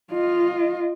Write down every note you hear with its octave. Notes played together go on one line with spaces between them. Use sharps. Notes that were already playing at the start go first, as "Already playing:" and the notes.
F4 D#5